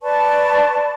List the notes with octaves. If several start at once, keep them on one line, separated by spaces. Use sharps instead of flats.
B4 D5 A5 C#6